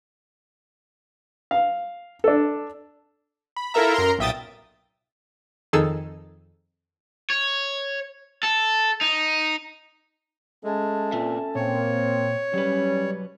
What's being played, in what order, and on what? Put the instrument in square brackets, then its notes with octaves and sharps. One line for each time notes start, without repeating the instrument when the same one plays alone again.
[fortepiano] F5
D4 A4
[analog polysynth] B5
E4 F4 A4 A#4 E5 A#5
F#2 A#4 A#5 C6
B1 A#2 E5 G5 D#6 A6
[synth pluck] F2 D#3 G#4 A4 E6
[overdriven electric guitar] C#5
A4
D#4
[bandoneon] G#3 [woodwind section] A3 C#4 A5
[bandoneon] A#2 [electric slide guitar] C4 B4 E5
[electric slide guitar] A#2 [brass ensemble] A#3 C4 [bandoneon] C#5
[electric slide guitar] F#3 B4 [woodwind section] G3 [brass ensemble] C#4